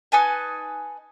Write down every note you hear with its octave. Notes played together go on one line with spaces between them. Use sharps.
D#4 B4 G#5 A5